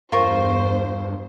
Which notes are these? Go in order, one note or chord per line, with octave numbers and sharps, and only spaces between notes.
E2 G2 F4 A#4 C5 C#6